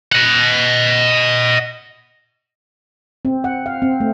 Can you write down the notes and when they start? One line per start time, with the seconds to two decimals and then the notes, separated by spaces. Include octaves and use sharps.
0.12 D#5 F#5
3.25 C4
3.44 F#5
3.66 F5
3.82 C4
4.00 A3